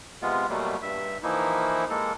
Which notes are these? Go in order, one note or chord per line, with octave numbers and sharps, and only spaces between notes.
C3 G#3 B3 F4
B2 F#3 G3 A3 A#3
G2 E5
E3 F3 A#3 D#4 E4
G#3 A#3 A4